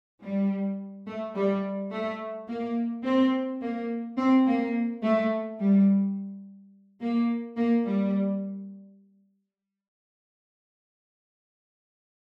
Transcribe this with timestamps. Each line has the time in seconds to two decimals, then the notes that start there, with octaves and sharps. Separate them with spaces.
0.22 G3
1.07 A3
1.35 G3
1.91 A3
2.48 A#3
3.04 C4
3.61 A#3
4.18 C4
4.46 A#3
5.03 A3
5.59 G3
7.01 A#3
7.56 A#3
7.86 G3